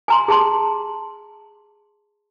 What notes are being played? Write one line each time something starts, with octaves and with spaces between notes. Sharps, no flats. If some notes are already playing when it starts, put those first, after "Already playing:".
G#5 A#5 C6
G#4 A5 C6